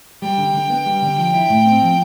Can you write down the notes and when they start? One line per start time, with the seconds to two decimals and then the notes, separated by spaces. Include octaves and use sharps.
0.22 G3 G5
0.38 D3
0.54 D3
0.70 B3
0.86 G3
1.02 D3
1.17 F3 G5
1.34 E4
1.49 A2
1.65 C4
1.82 F3